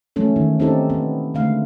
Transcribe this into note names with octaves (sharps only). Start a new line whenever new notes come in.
E3 F#3 G#3 A3 C#4 A4
D#3
C4 C#4 D#4 G4 A4
B3
D3 G#3 A3 F5